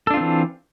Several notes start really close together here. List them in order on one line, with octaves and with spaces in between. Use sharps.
A4 D4 F4 C4 E3